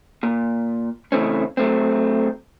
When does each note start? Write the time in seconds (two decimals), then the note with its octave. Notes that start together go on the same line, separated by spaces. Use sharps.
0.23 A#2
1.12 C#3 E3 A3 C4 C#4
1.57 F#3 A3 C4